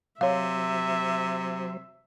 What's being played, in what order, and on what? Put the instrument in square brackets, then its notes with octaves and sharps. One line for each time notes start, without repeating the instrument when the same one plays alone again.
[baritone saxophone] C3 [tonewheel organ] F#3 C5 [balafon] C#5 F5 [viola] E5